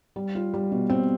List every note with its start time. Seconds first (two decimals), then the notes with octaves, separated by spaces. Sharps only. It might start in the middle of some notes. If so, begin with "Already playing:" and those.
0.16 G3
0.35 F4
0.54 G3
0.72 B2
0.90 C4